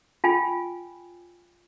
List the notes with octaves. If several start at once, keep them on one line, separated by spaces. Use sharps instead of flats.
F4 G5 G#5 B5